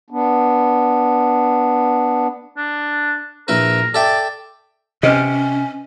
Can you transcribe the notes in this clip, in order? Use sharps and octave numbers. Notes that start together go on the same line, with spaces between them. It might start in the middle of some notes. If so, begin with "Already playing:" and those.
B3 D4
D4
A#1 E4 A#4 B4
A4 D5 E5 G5
C3 C#4 B4 D#5